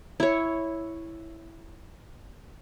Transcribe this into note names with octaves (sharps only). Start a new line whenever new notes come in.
E4 C#5